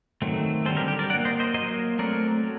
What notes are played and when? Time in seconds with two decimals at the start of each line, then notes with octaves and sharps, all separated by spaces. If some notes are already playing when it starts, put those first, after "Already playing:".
0.22 D#3 F#3 A3 C4
0.65 D3 G3 C4 A4 C5
0.76 G4 A#4
0.88 G4
0.99 A#4 D5
1.10 F#3 D5 F#5
1.14 A#3
1.25 C5 D#5
1.40 C5 D#5
1.54 F#3 A#3 C5 D#5
1.99 F#3 A3 C4 A#4 D5
2.44 F#3